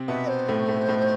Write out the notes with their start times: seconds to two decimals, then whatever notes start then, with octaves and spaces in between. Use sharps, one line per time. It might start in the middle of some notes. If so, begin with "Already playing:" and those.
Already playing: C3 C4
0.08 B2 B3 E5
0.29 C5
0.48 A2 A3
0.68 A2 A3
0.89 A2 A3